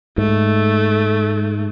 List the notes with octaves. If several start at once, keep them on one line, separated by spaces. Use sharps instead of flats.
G#2 A3